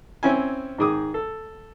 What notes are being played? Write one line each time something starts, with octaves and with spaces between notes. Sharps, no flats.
C4 C#4 E4 G#5
G#2 D#3 G#4 D6 D#6
A4